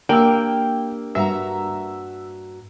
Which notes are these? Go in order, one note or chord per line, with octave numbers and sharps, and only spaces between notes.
A#3 D4 G4 A#4 G5 E6
G2 F#4 E5 A#5